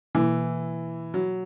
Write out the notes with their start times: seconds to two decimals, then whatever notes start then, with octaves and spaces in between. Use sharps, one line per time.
0.15 B2 E3 A#3 E4
1.14 F#3